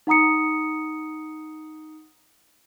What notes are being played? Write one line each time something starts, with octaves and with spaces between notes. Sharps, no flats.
D#4 F#5 A#5 D#6 C#7